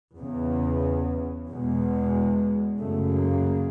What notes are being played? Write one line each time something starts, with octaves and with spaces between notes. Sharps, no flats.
E2 C#3
E2 B2 G#3
F#2 C#3 A3
A#3